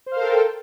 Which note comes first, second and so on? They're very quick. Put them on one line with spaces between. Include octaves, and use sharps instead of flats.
C5 F5 A#4 A4 G5